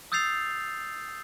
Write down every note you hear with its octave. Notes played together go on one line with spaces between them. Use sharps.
D#6 E6 G6 A6 C7 F7